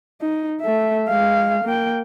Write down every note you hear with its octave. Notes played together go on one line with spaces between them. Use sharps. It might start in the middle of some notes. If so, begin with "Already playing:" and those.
D#4
A3 E5
G#3 F5
A#3 G5